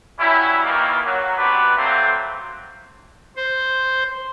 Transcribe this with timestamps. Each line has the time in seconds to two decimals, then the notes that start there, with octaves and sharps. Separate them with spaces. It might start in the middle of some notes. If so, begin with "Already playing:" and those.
0.19 F#3 G3 C#4 E4
0.64 D#3 E3 G3 A#3
1.05 F#3
1.37 B3 C4 D4 F#4 G4 B4
1.77 F#3 A3 A#3 C4
3.37 C5